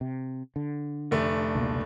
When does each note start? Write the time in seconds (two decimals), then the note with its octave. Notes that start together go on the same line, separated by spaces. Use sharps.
0.01 C3
0.56 D3
1.11 F1 A3 D4
1.55 C#2 B2 A#3